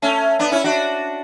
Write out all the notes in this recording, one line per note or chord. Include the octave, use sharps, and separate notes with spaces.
A3 C#4
B3 D4
C#4 E4
D4 F#4